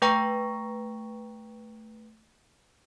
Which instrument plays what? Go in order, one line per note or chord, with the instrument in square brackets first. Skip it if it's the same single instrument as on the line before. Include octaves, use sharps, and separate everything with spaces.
[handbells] A3 B4 G5 A#5 C#6 A#6